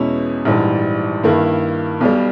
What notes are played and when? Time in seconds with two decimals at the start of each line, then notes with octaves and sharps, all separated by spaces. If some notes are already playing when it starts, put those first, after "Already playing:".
Already playing: E2 B2 G#3 C#4 E4
0.45 A#1 G#2 E3 G3
1.24 G2 D#3 A#3 E4
2.01 B1 B2 G3